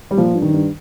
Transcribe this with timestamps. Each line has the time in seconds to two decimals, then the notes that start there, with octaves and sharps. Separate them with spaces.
0.11 G3
0.17 A#2 F3
0.35 G2
0.42 D#3
0.53 G2